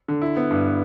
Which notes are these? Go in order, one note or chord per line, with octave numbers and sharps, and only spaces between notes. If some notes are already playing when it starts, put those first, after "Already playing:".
D3
E4
B3
G2